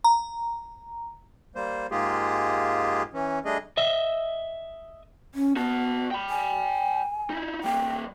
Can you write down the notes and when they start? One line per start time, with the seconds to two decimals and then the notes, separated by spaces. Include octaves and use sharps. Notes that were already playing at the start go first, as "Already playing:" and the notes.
0.04 A#5
1.55 G3 A#3 C5
1.91 G#2 G#3 A#3 F4 G4 G#4
3.13 E3 C#4
3.45 G3 A3 D4 G#4 D#5
3.77 D#5 E5
5.35 C#4
5.56 B3 F#4 A5
6.11 G5 B5
6.30 G#5
7.30 D#4 E4
7.64 G3 A#3 G5